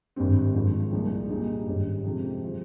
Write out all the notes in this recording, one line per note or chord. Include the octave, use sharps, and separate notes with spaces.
G#1 G2 G3 C4
G#1 G#2 F3
C2 A#2 F3 G#3
A#2 G3 A#3 D#4 G#4
G#1 G2 G3 C#4 G4
F2 C3 F3 G#3
F3 G#3